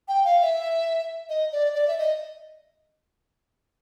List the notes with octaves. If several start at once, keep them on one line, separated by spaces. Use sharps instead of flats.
G5
F5
E5
D#5
D5
D5
E5
D#5